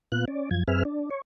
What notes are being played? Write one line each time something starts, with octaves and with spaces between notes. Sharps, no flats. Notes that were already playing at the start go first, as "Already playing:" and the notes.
A#2 B3 F4 F#6
C#4 D5
F#2 F3 G#6
F#2 C4 G#4 B4 E5 F6
D4
C#5